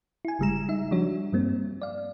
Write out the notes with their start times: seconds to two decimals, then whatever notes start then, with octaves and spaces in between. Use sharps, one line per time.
0.25 E4 G#5
0.39 G1 C#3 G3 G#3 A#5 E7
0.69 D#4 E5
0.91 F3 G3 D4 F#4 C#5
1.33 G2 G3 A#3 C4
1.82 D5 F5